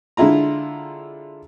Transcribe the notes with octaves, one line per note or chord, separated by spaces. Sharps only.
D3 G#3 E4 F4 A#5